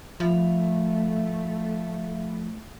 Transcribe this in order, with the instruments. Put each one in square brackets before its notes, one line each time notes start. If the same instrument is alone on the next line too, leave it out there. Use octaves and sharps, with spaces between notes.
[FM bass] F3 [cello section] A3 [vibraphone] E5 F5 B5